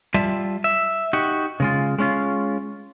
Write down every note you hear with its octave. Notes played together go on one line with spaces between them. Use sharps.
G3 F4 E5 A5
E5
D#4 F#4 G4
C#3 G#3 F4
G#3 C#4 F4